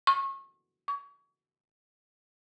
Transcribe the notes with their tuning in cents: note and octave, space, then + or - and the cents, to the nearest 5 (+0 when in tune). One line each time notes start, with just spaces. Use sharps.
C#6 -30
C#6 +35